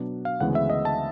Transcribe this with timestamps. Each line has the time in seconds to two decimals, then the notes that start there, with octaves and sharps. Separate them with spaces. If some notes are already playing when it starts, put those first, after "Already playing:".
Already playing: B2 F#3 B3 D4
0.25 F5
0.40 D2 C#3 E3 G#3 B3 F#5
0.55 E5
0.70 D#5
0.85 A5